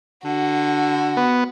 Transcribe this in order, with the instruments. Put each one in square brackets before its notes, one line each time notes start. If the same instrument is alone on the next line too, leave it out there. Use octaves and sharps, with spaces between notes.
[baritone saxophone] D3 [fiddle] F#4
[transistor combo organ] B3